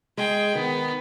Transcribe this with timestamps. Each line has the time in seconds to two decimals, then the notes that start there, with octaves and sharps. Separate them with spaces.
0.18 G#3 G#4 G5
0.55 D#3 B3